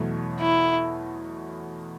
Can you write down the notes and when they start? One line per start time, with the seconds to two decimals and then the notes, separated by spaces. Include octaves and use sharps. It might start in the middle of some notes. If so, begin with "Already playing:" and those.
Already playing: E2 B2 F#3 A3
0.40 E4